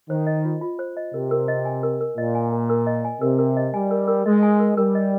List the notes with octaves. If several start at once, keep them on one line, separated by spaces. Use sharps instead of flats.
D#3 C5
D#5
F4
F4
C5
D#5
C3 A#4
A#4
D#5
G#5
A#4
A#4
A#2 D#5
G#5
A#4
A#4
D#5
G#5
C3 A#4
A#4
D#5
G3 G#5
A#4
A#4
G#3 D#5
G#5
A#4
G3 A#4
D#5